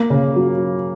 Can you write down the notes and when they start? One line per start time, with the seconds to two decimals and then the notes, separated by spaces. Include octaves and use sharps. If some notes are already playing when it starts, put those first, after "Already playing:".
Already playing: A#3
0.10 C#3
0.36 F#3